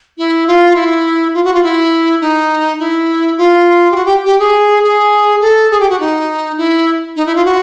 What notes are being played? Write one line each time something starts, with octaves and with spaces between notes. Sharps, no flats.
E4
F4
E4
F4
F#4
F4
E4
D#4
E4
F4
G4
F#4
G4
G4
G#4
G#4
A4
G#4
G4
F#4
D#4
E4
D#4
E4
F4
F#4